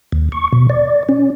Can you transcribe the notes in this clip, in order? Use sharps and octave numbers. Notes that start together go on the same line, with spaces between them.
D#2
C#6
B2
D5
C#4